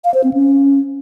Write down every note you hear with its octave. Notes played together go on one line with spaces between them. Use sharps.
F5
C5
C4
C#4